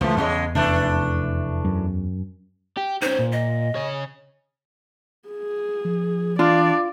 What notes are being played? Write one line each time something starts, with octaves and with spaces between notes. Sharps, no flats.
C#2 D3 E3 F3 A3
E2 A2 C#3 G#3
F1 E3 A3 D4
F#2
G4
C#4 D#4 C5
A#2
D#5
C#3 C#5
G#4
F3
E3 D4 F4 D5